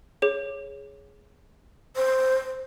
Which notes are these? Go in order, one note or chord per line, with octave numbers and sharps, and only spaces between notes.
G#4 C#5
C5